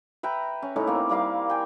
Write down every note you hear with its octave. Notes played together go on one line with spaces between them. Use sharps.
B4 E5 G5 A#5
C#4
A2 C#4 D#4 E4
A#3 C4
G3 A#3 E4 F5
G5 G#5